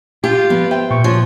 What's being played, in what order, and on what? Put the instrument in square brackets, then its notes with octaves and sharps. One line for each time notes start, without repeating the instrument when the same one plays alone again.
[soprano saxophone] F4 [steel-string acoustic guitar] G4
[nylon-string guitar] F3 B3
[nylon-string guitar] C5 [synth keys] E5 [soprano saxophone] G5
[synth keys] A#2 [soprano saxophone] C#6
[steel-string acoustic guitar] F3 [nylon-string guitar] F#4 [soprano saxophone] C#5